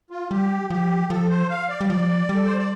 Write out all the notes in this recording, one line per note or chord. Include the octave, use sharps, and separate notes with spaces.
F4
G3 G4
F3 G4
F3 A4
C5
F5
D5
G3
F3 D5
G3
A4
C5
D5